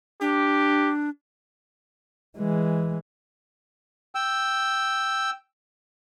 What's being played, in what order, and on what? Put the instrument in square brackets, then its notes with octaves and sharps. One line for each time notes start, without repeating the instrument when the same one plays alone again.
[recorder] D4 [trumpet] G4
[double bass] E3 G#3
[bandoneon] G5 E6